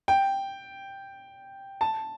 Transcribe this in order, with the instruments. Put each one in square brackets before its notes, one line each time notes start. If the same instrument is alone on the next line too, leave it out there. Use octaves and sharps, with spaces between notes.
[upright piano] G5
A5